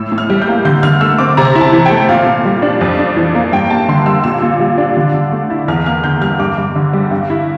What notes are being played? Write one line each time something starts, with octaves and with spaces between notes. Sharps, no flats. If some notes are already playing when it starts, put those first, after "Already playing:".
Already playing: A2 E6
A2
F6
G3
G6
A#3
D3 G6
D3 F6
A3 E6
C4 D6
C3 A#5
E4
A5
E3
G5
A3
A#2 F5
A#2
G3
D4
F2
D4
E3
A#3
G2 G5
A#3 A5
D3 C6
G3 E6
A#2 E6
A#2
G3
D4
D3
D3
A3
E4
E2 F6
A#3 F6
D3 G6
G3 F6
G2 D6
G2
D3
G3
G2
E4